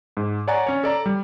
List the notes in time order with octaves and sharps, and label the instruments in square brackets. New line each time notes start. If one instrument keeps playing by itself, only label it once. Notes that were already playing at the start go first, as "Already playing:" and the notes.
[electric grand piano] G#2
C#5 D5 F#5 G#5 A#5 A6
C#4 C#5
A4 D5 A#5
G3